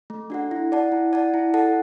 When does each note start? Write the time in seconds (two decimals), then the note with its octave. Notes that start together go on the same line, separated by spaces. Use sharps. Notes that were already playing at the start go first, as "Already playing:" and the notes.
0.10 A3
0.30 D4 F#4 A4 F#5
0.51 E4
0.72 D5 F#5 A5
0.92 E4
1.13 D5 F#5 A5
1.34 E4
1.54 A4 F#5 A5